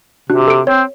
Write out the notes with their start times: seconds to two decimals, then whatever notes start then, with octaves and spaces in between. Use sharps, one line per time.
0.30 C3 D4 F#4 F#6
0.47 A4 D7
0.67 C4 C#5